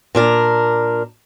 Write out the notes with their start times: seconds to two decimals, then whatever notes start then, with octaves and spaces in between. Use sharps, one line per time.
0.15 A#2 D4 A#4